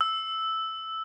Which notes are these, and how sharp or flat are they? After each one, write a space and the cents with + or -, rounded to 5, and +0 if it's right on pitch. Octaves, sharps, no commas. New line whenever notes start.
E6 -5